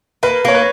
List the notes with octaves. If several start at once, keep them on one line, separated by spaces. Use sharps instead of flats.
A#3 B4
A#3 C#5
B4